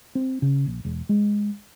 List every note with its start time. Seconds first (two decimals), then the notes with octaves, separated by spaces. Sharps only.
0.15 C4
0.42 C#3
0.66 A#1
0.85 E1
1.09 G#3